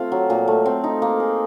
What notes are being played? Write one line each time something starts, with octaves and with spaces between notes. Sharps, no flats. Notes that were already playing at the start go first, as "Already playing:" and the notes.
Already playing: A3 C4 F4
F#3
A#2
A3
C4
D#4
A#3
G#4